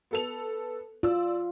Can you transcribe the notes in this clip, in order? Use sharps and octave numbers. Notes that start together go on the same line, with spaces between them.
B3 A4 F7
F4 D5 E6